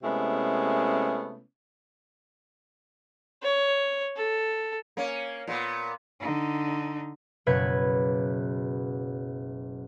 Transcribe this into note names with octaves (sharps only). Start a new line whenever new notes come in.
C3 G#3 A3 B3 C#4 E4
C#5
A4
A#3 C#4
A#2 B3
D3 D#4
F#1 B2 B4 C#5 G#6